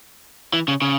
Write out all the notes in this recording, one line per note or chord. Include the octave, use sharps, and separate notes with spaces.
E3
C#3
C#3